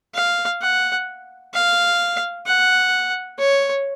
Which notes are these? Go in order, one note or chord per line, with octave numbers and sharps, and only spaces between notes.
F5
F#5
F5
F#5
C#5